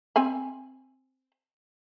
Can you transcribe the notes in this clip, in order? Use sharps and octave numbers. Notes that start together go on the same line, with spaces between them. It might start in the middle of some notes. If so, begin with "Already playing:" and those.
C4 G#5 B5